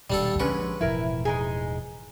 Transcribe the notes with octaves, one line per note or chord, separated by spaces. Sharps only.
D#1 B2 G3 D4 A4
A#1 D3 G#3 C#4 B4
E1 A2 F3 E4 A#4
G#3 D#4 G#4